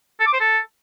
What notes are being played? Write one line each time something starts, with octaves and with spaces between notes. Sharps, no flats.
A4
D6
C5
A4